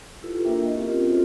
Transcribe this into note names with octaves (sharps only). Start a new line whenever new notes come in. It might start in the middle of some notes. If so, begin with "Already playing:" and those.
E4 F4 G4 A4 B4
A#3 D4 A#4 E5 G5
D#5
C4 C#4 F4 G4 A#4
F4 F#4 A4 C5